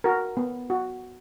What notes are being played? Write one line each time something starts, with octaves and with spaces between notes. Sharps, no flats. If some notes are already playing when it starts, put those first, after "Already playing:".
F#4 A#4
B3
F#4